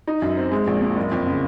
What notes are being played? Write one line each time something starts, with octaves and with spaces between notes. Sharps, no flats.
D#4
F#2
C4
G#3
A#1
A#2
F#1
F2
C#3